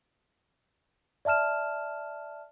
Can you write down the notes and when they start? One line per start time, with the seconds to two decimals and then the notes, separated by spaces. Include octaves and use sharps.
1.25 D5 E5 A5 F6 E7